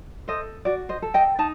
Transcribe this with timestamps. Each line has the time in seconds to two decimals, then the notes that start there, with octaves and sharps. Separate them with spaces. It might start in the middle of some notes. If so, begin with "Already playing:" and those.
0.28 A4 C5 D#5
0.65 F#4 D5
0.89 C5 D#5
1.02 A4
1.14 D#5 G5
1.39 D#4 A5